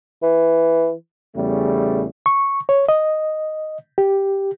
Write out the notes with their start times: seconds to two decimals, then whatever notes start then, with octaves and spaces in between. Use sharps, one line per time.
0.23 E3
1.35 E2 C#3 G3 A3
2.26 C#6
2.69 C#5
2.89 D#5
3.98 G4